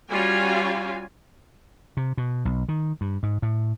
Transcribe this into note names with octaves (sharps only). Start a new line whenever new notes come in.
G3 C#4 F4 F#4 G#5
C3
B2
B1
D#3
G2
G#2
A2